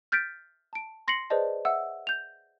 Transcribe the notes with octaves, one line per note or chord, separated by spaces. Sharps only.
F6 G6 A6 B6 D7
A5 D7
C6 A#6 C7 C#7 F#7
G#4 B4 C5 D5 D#5 A5
E5 F#5 E6
G6 F7